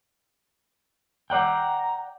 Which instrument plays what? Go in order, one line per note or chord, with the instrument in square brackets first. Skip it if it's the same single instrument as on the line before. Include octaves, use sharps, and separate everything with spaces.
[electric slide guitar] D5 F#5 G5 [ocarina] A#5